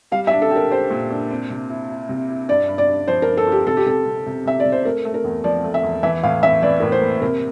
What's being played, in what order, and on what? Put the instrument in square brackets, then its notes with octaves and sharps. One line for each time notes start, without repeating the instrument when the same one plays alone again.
[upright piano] G3 [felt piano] F5
[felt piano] E5
[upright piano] D4
[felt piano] A4
[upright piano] G4 [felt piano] A#4
[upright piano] G4 [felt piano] C5
[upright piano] A#2
D4
C4
C3
E4
E4
C3
E4
[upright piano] G2 [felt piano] D5
[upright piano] G2
[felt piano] D5
[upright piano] G2
[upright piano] F3 [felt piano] C5
[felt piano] A#4
[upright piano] G2
[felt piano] A4
[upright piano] F4 [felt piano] G4
[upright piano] C3 [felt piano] A4
[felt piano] G4
[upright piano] C3 [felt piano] A4
[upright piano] C3
C3
[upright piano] C3 [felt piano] E5
[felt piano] D5
[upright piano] C3
[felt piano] C5
[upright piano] A3 [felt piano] A#4
[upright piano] A3
[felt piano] A#4
[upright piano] E2
[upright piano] F3 [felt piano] D5
[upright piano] A3
[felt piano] E5
[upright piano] E2
[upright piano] E3 [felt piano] E5
[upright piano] A2 [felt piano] F5
[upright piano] E3 [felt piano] E5
[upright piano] E3 [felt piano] D5
[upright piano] A2 [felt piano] A#4
[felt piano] C5
[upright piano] A#3
[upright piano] C3 [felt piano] A#4